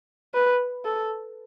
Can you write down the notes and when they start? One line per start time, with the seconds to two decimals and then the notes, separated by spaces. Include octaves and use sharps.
0.34 B4
0.85 A4